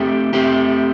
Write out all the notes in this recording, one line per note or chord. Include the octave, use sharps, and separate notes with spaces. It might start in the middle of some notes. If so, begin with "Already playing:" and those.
Already playing: A3 C4 G4
A3 C4 G4